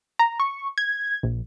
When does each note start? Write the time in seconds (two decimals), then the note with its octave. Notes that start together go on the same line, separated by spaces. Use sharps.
0.19 A#5
0.40 C#6
0.78 G#6
1.23 A#1